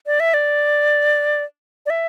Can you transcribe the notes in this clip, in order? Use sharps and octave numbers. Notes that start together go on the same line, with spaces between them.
D5
E5
D5
D5
E5